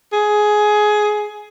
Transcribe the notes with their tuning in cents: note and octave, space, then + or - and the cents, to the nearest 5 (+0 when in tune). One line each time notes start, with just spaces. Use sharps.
G#4 +15